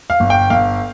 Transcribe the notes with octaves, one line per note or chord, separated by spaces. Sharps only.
F5
G1
G5
G1 F5